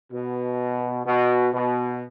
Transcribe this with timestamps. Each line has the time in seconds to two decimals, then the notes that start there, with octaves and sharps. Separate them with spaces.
0.13 B2
1.06 B2
1.53 B2